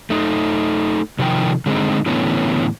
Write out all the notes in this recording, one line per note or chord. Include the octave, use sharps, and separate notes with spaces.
A3 D#4
C3 D#3 F3 G5
D3 G#3 B3 C4 D#4
A2 D3 E3 B3 C#4